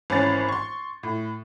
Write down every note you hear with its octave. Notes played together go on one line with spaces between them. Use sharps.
G#1 E3 C#4 A6
C6 C#6
A2